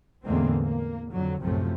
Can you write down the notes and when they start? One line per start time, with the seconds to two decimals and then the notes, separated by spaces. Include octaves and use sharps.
0.24 E2 A2 D3 G#3 A#3 C4
0.63 A#3
1.11 F2 D3 F#3
1.41 B1 F#2 A2 C3 F3 A3